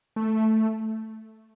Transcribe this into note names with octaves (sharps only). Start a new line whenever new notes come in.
A3